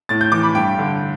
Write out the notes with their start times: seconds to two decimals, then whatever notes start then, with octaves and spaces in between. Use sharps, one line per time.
0.09 A2 A6
0.21 G6
0.32 E3 D6
0.43 B5
0.55 G2 G5
0.79 D3